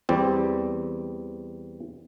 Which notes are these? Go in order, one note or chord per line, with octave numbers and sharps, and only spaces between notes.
E2 G3 C4